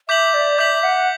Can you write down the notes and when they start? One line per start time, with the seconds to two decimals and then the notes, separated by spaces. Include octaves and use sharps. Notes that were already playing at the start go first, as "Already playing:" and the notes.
0.09 E5 D6 G6 B6 F#7
0.34 D5
0.58 E5 D6 G6 B6 F#7
0.83 F#5